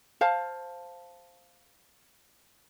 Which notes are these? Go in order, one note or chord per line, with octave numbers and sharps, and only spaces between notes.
C5 F5 A5